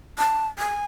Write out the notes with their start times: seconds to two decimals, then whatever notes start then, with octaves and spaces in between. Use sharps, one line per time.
0.18 A5
0.59 G#5